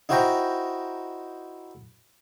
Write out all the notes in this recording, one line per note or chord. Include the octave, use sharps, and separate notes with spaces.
D#4 E4 F#4 C5 G5 A#5